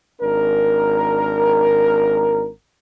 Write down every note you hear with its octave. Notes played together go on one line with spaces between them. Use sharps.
G#1 D4 A#4